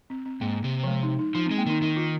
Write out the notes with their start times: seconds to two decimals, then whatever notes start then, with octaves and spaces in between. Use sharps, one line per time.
0.10 C4
0.25 C4
0.41 G#2 A#3
0.64 C3
0.84 F3
0.88 G#3
1.03 D#4
1.19 D#4
1.35 F3 D#4
1.46 C4
1.51 G#3
1.58 A#3
1.66 D#3 D#4
1.82 D#3 D#4
1.97 F4